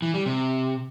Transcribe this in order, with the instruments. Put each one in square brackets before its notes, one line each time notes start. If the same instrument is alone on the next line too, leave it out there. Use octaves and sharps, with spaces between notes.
[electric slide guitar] E3
G3
C3